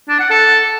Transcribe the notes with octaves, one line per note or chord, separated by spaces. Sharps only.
D4
F#5
A4